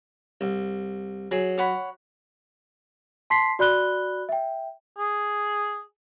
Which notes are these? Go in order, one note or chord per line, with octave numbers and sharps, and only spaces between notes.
C2
F#3 G#4
C#5 F#5 B5
A5 C6 B6 C7
F#4 D5 B5 F#6 G7
E5 G5
G#4